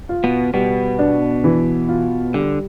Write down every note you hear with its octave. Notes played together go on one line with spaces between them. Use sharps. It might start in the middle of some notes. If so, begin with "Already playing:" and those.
F4
B2 B3
B2 G3 B3
D4
E3
F4
D3 G3